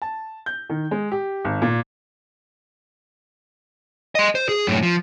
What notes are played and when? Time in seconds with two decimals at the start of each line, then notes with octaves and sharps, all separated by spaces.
0.02 A5
0.46 G6
0.70 D#3
0.91 G#3
1.12 G4
1.45 G#1
1.62 A#2
4.15 D#5 C6
4.35 C5
4.49 G#4
4.67 F#2 A2
4.83 F3